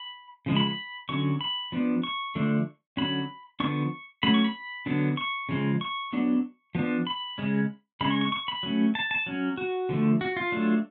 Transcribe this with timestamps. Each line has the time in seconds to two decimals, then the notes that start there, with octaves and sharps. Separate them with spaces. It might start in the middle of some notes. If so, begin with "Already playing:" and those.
Already playing: B5
0.46 C#3 F3 G#3
0.57 B5
0.67 B5
1.09 D3 F#3 C#4 C#6
1.41 B5
1.72 F3 B3 D4
2.03 C#6
2.35 D3 F3 A3 D4
2.97 D3 F#3 C#4 B5
3.60 D3 F3 B3 D4 C#6
4.23 F#3 A3 C#4 B5
4.34 C#6
4.44 B5
4.86 D3 F#3 B3 D4
5.17 C#6
5.49 C#3 F3 G#3
5.81 C#6
6.13 F#3 B3 D4
6.75 F3 B3 D4
7.07 B5
7.38 C#3 G#3 C#4
8.01 C#3 G#3 C#4 B5
8.11 C#6
8.21 C#6
8.32 C#6
8.48 B5
8.63 F#3 A3 C#4
8.95 A5
9.11 A5
9.26 F#3 C#4
9.57 F#4
9.89 D3 F3 A3
10.21 F#4
10.37 F4
10.52 F#3 A3 D4